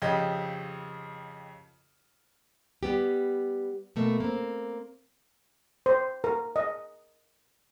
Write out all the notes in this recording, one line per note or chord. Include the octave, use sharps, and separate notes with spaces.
F2 C#3 G4 D#5
G3 B3 G4
B2 A3 A#3
A#3 C4
C5
A#4
D#5